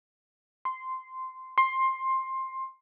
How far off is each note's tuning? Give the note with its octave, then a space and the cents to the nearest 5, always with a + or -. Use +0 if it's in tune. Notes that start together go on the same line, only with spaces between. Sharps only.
C6 -10
C6 +15